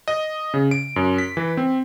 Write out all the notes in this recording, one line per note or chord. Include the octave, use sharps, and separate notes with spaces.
D#5
C#3
D7
F#2
B6
E3
C4